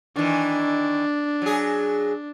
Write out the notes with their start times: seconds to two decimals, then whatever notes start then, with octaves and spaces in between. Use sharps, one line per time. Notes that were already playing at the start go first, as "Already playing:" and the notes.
0.16 D#3 E3 D4
1.42 F#3 G#4